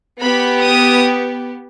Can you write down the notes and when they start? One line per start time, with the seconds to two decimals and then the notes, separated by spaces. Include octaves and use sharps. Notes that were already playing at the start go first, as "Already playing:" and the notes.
0.21 B3 G4 B5
0.61 D#6